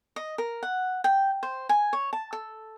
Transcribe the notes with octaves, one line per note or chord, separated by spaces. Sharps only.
D#5
A#4
F#5
G5
C5
G#5
C#5
A5
A4